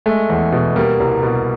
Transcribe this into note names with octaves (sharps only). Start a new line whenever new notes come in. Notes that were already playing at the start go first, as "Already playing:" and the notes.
G#3 A3
E2
B2
G3 A#3
C2
B2